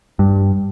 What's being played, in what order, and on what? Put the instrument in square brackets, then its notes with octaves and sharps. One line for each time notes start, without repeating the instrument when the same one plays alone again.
[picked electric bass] G2